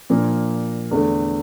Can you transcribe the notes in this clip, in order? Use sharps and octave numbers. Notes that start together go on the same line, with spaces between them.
A#2 F3 A#3 D4
E2 D3 A3